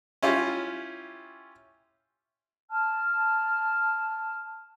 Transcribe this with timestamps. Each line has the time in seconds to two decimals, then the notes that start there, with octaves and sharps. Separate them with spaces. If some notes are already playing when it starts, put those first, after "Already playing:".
0.22 C#4 E4 F4 G4
2.71 A5 F6